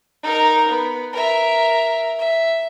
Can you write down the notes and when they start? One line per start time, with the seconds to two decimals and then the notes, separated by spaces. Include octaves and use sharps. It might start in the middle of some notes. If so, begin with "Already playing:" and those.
0.23 D#4 A#4
0.68 B3
1.13 A#4 E5
2.19 E5